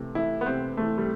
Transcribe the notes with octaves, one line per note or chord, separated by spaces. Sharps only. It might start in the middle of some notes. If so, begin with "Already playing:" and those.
Already playing: C3 E3 A3
E3 A3 E4
B3
C3 C4
E3 A3
G3